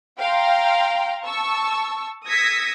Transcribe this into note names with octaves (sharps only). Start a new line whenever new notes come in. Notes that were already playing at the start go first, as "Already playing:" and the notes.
F5 G5 A#5 C6
A5 C#6 E6
D#6 E6 G#6 A#6 B6 C#7